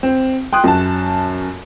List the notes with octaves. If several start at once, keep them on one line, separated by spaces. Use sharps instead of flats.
C4
G5 C6 D#6 F#6
F#2 A5